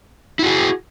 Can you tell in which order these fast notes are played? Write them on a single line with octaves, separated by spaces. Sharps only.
E4 F#4 G#4